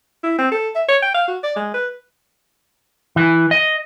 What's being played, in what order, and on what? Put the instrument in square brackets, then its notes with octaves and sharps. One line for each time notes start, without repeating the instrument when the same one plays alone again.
[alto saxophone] E4
C4
A4
E5
C#5
G5
F5
F#4
D5
G#3
B4
[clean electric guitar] E3
D#5